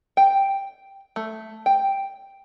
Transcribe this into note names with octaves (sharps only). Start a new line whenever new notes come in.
G5
A3
G5